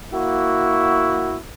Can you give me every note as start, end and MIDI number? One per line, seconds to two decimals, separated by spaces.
0.13 1.37 58
0.13 1.37 64
0.13 1.37 66